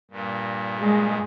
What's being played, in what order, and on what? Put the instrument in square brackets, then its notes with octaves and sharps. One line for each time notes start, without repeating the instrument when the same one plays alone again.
[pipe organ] G2 A#2
[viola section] G#3